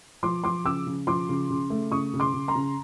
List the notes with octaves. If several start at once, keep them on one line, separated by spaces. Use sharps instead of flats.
F3 C6 D6
F3 C6 D6
C#3 D6 E6
C#3
F3 C6 D6
C#3
C#3
A3
C#3 C#6 D#6
C#3
C6 D6
C#3
A#5 C6
C#3